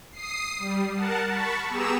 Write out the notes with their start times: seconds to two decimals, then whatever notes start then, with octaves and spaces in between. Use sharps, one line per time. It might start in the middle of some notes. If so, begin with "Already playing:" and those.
0.12 D#6 C7
0.58 G3
0.94 A#4 F#5 A5
1.27 A5 B5 C#6
1.69 B3 G4 G#4 A#5 E6 E7